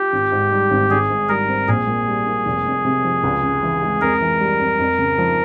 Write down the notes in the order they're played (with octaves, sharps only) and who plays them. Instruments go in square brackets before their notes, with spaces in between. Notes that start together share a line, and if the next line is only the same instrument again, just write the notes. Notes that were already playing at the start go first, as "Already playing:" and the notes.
Already playing: [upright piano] F4 [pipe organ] G4
[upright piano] G#1
G#2
G3
G#1
[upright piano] G#1 [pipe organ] G#4
[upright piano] G#2
[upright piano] G3 [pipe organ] A#4
[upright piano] C4
[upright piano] A#1 [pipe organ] G#4
[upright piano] A#2
G3
A#3
F1
F2
C3
F3
C#2
C#3
E3
G#3
[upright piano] F2 [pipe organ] A#4
[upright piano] E3
G3
F2
F2
C#3
F3